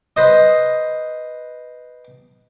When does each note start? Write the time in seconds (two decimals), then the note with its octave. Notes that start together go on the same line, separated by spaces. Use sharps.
0.16 B4 C5 D#5